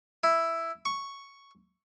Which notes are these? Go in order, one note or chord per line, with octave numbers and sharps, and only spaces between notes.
E4
C#6